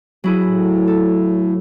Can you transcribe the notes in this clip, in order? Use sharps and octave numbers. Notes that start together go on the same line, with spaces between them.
F#3 E4 G#4
A2
A4